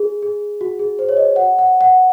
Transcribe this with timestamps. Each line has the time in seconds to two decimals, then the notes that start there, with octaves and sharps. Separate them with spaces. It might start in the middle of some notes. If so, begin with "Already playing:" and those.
Already playing: G#4
0.22 G#4
0.61 F#4
0.79 G#4
0.99 C5
1.09 C#5
1.17 D#5
1.36 F#5
1.59 F#5
1.81 F#5